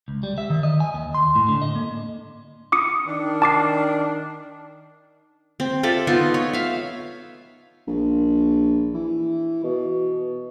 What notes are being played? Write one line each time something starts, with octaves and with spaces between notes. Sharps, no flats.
C#2
G3
E5
D#3
D#5
G#5
D#2
C6
A2
D3
D#5
A#3
D6 D#6 C#7
D#3 D4
A5 D6 C7
C4
F4 A4 D5 E5
B3 D#4 F4
C#5
E5 F5
A#1
E3
B2